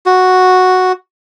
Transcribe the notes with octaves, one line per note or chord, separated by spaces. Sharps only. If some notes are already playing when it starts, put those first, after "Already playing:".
F#4